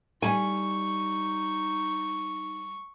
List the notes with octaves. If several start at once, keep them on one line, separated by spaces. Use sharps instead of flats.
G3 D#4 G#5 C#6